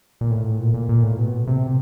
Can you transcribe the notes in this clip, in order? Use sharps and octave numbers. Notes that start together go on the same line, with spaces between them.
A#2
A2
A#2
A#2
A#2
A2
B2
C3